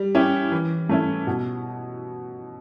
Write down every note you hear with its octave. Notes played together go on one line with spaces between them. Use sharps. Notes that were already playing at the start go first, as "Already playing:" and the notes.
Already playing: G3
C#4 E4 G4
E3
A3 C#4 E4
B2